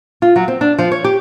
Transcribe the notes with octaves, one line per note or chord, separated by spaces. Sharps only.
F4
F#3
C4
D4
F3
C#5
G4